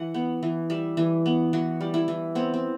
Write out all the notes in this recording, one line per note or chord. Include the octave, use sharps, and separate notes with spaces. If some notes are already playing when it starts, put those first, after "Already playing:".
Already playing: E3 F#5
B3
E3
G3 E5
E3
B3
E3 F#4
G3
E4
E3
B3 C4
C4